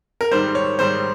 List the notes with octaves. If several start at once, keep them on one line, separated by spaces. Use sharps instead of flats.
A#4
G#2 D#3 G3 C5
C#5
G#2 D#3 G3 C5